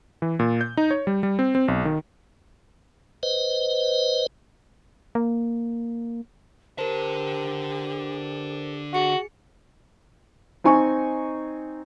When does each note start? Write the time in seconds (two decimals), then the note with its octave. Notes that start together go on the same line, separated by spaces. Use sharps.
0.22 E3
0.39 A#2
0.61 G6
0.77 D#4
0.91 C#5
1.07 G3
1.23 G3
1.39 C4
1.55 C4
1.68 B1
1.85 D#3
3.23 B4 C5 D#5
5.15 A#3
6.78 D3 G4 A#4 C5 A5
8.94 F#4 G#4 C#7
10.64 C4 D#4 G#5 C#6